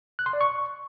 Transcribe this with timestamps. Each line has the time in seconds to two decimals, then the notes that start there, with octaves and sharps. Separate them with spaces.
0.19 F#6
0.26 C6
0.33 D5
0.41 C#6